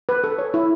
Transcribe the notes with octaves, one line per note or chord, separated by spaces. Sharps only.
B4
A4
C#5
E4